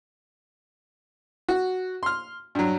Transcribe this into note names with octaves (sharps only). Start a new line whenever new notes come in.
F#4
C6 F6
G2 F#3